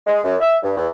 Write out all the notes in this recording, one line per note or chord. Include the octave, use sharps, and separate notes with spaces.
G#3
F#2
E5
G2
E2